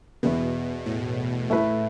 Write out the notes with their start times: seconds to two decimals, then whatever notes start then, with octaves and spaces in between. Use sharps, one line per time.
0.23 E2 B2 E3 B3
0.86 A2
1.50 A2 A3 E4 B4